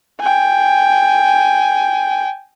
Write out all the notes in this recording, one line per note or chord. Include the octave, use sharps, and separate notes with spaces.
G5 G#5